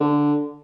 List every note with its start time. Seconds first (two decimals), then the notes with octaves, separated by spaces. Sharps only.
0.01 D3